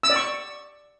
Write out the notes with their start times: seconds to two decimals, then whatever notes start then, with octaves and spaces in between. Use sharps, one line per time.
0.03 E6
0.10 D5
0.16 C#6